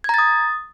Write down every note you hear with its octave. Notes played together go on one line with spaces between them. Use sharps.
A#5 D#6 G#6 A6